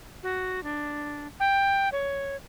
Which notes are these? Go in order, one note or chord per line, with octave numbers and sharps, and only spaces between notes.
F#4
D4
G5
C#5